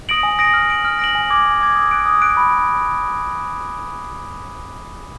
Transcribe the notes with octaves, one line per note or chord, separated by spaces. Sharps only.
D#6 A#6 D7 F#7
G#5
D#6 A#6 D7 F#7
F6
A#6 D7 F#7
F6
A#6 D7 F#7
G#5
D6 G#6
G#5
D6 G#6
D#6
F#6 D7
D#6
F#6 D7
B5